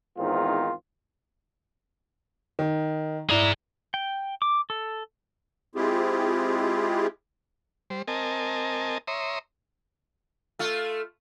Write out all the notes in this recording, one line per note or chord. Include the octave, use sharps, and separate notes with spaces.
E2 G#2 D#3 C4 F4
D#3
E4 G#4 D5 A#5
G5
D6
A4
G#3 C4 E4 F4 G4 G#4
G3 C5
C4 A#4 D#5 G#5 A5
C#5 E5 A#5 C6 D#6
A3 F4